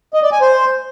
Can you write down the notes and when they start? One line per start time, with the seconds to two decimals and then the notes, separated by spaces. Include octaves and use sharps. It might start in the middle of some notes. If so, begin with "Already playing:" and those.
0.14 D#5
0.23 D5
0.32 G#5
0.41 C5